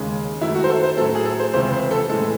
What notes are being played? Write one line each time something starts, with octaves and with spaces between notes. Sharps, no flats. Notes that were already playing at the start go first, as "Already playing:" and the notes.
Already playing: D#2 C#3 G#3
F#2 D#3 F#3 A3 E4
F#4
C5
A4
C5
A2 F#3 A3 A4
G#4
A4
C5
C#2 C3 E3 C5
C5
A4
A2 E3 G#3 A4